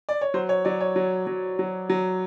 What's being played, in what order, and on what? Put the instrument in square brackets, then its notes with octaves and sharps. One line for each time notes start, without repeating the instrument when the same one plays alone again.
[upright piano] D5
C#5
F#3 C5
C#5
F#3 D5
C#5
F#3
F#3
F#3
F#3